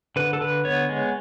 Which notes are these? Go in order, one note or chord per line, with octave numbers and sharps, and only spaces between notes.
D3 B4
A4
D3 B4
B3 C#5
G#3